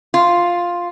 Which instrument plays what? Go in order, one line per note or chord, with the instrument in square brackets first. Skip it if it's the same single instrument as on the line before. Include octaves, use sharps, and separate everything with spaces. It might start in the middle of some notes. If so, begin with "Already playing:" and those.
[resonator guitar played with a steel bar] F4